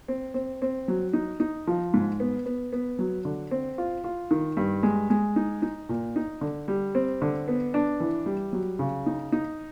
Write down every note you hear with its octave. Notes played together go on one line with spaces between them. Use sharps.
C4
C4
C4
F#3
D#4
D#4
F3
G#2
B3
B3
B3
F#3
D3
C4
F4
F4
D#3
G2
G#3
G#3
D#4
D#4
A#2
D#4
D3
G3
C4
D3
B3
D4
E3
G3
F#3
C#3
D#4
D#4